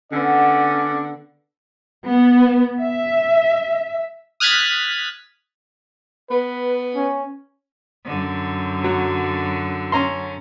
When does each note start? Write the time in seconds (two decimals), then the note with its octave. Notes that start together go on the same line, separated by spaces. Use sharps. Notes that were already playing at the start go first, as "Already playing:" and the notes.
0.12 D3 B3 C#4 A4 D5
2.06 B3
2.82 E5
4.40 D#6 F6 F#6 G#6 A6 B6
6.30 B3 B4
6.95 C#4
8.05 F#2 D3
8.84 F#3
9.92 C#4 A#5 C6